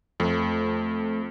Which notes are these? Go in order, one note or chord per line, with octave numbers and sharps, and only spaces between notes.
F2 A3